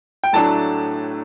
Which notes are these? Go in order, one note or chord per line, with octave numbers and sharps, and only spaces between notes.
G5
A2 F#3 A3 D4 A5